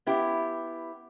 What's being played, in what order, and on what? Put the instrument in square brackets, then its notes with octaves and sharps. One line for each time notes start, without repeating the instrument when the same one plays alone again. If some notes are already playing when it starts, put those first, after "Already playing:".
[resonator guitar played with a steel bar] B3 E4 G4